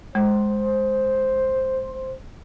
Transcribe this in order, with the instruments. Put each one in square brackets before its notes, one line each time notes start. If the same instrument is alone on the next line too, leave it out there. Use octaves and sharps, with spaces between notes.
[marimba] G#3 [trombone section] C5